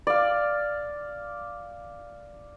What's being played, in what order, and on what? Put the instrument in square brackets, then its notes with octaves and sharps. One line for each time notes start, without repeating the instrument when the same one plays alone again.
[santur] D5 F5